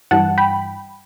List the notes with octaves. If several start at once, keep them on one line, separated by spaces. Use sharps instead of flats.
G2 E3 G3 F#5 A5
G5 B5